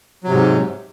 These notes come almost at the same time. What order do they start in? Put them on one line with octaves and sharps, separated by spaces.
F#3 C3 G#2